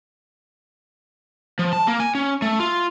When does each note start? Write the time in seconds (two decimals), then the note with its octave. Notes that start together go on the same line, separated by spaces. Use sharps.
1.59 F3
1.73 A5
1.88 A#3
2.00 G#5
2.15 C#4
2.42 A3
2.60 F4